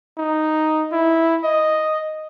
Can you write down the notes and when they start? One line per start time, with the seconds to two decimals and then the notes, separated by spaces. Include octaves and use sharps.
0.18 D#4
0.92 E4
1.44 D#5